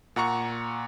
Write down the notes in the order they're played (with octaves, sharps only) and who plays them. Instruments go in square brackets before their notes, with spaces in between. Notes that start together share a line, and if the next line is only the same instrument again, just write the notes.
[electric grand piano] A#2 F#5 A#5 C#6 C#7